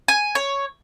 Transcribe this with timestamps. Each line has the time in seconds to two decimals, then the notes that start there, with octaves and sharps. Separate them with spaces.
0.08 G#5
0.35 C#5